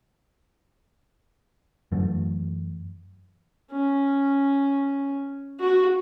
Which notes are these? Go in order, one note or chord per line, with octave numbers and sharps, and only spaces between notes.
F#2 E3 F#3 A3
C#4
F#4